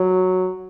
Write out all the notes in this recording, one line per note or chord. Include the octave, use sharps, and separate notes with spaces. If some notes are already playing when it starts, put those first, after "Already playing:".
Already playing: F#3